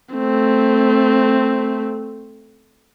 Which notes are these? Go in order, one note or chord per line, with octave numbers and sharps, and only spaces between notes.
A3 C4